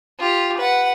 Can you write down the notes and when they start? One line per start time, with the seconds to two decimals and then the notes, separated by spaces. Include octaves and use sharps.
0.19 F4 G4
0.57 B4 F#5